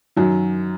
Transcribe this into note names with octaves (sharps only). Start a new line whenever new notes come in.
F#2 D#3 F#3